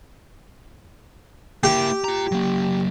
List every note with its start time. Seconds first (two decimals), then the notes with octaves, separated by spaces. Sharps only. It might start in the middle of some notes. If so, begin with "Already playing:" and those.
1.63 A#3 E4 G4
2.04 F4 A#5
2.32 F#3 A#3